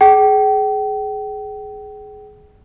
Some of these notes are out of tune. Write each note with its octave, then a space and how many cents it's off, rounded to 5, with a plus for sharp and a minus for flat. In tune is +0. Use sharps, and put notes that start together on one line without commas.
G#4 +20 G5 -35